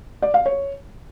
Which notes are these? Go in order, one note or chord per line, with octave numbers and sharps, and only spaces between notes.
D5
F5
C#5